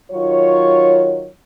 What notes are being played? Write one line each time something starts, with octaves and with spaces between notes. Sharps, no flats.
D#3 F#3 F4 C#5